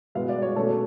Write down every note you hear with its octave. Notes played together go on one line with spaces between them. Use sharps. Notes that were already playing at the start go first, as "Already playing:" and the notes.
B2 G#3 B3 F5
D5
C#5
B2 A3 C#4 A4